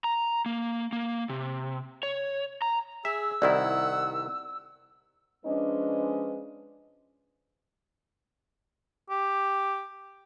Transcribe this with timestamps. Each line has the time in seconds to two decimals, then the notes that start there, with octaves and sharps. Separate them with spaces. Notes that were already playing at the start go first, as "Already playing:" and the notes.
0.04 A#5
0.46 A#3
0.92 A#3
1.29 C3
2.03 C#5
2.62 A#5
3.05 G#4 E5 E6
3.42 C2 D#3 E4 D5 F#5
5.45 F3 G#3 C#4 D4 B4 D#5
9.10 G4